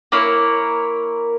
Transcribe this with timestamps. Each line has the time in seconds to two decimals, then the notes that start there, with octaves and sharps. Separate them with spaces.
0.12 A#3 E4 A#4 C#5